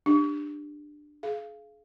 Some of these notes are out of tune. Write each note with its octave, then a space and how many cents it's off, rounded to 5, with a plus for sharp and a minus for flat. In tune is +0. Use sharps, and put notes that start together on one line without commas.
D4 +15 G4 +25
G#4 +35 F5 -20